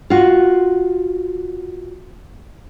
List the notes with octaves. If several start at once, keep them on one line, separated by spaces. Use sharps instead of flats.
F4 F#4